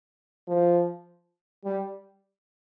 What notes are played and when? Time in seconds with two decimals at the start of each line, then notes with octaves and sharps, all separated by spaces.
0.48 F3
1.65 G3